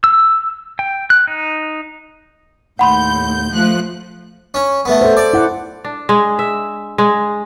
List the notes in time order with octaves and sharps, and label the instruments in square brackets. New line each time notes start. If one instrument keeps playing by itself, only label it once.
[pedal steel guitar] E6
G5
F#6
D#4
[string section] D#2 A2 G6 [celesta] F#5 B5 C6
[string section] F3 A3 F#6
[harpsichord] C#4
A3 B3
[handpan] A4 C5
[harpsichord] D5
[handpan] E4 F#5
[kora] D4
G#3
E5
G#3